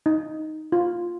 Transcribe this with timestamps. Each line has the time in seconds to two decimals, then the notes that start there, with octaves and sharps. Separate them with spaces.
0.06 D#4
0.72 F4